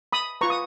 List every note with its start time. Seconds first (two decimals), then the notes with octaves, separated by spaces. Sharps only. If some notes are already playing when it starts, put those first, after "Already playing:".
0.13 B5 D#6
0.41 F4 B4 A#5 C#6
0.50 D#6